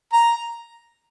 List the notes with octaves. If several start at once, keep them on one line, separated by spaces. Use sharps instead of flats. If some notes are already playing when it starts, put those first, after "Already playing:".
A#5